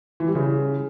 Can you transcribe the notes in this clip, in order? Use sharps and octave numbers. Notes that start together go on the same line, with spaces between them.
E3
G3
C#3